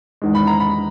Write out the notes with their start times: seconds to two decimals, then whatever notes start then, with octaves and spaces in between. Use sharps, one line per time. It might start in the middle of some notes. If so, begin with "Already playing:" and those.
0.22 E2 D#3 G#3
0.35 B5
0.47 A#5
0.60 B5